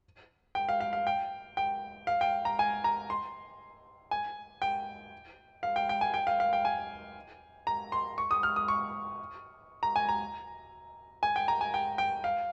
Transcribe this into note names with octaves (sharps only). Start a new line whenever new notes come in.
G5
F5
F5
F5
G5
G5
F5
G5
A#5
G#5
A#5
C6
G#5
G5
F5
G5
G5
G#5
G5
F5
F5
G5
G#5
A#5
C6
C#6
D#6
F6
D#6
C#6
A#5
G#5
A#5
G#5
G5
A#5
G#5
G5
G5
F5